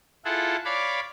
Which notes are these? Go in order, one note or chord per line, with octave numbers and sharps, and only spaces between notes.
E4 F4 G#4 A4 F#5
C#5 D5 F5 B5 D6